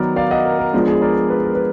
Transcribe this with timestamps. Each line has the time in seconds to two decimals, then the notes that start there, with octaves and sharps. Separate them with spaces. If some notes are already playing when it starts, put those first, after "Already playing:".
Already playing: D#3 F#3 B3 A#4 D5
0.16 D5 F5
0.31 D#5 F#5
0.45 A#4
0.59 A#4
0.73 F3 G#3 B3 D4 A#4
0.87 G#4
1.02 A#4 D5
1.30 G#4 B4
1.44 A#4
1.55 B4